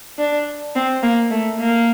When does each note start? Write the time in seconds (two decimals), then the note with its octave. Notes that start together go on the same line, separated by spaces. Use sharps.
0.18 D4
0.75 C4
1.03 A#3
1.31 A3
1.59 A#3